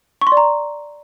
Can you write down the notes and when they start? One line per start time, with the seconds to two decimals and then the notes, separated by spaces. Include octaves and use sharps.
0.21 C#6
0.27 C6
0.32 D5
0.37 A#5